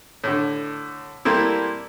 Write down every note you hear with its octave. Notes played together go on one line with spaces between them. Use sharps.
A2 D3
G3 A3 A#3 C4 E4